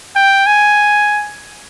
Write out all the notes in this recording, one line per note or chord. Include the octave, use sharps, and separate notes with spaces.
G5
G#5